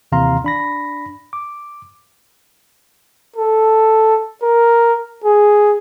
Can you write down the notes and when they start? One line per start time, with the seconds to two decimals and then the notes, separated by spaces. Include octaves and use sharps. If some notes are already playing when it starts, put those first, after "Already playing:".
0.12 D#2 C3 E3 F5 A#5 C6
0.44 D4 B5 A#6
1.33 D6
3.37 A4
4.43 A#4
5.25 G#4